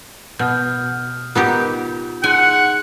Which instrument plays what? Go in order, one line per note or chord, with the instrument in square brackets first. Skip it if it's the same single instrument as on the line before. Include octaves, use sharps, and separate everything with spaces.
[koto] B2 [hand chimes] D#6 F6 G6
[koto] B3 D#4 G4 [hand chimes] F4 A#4
[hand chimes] D#4 G#4 C6 [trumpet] F#5 [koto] G#5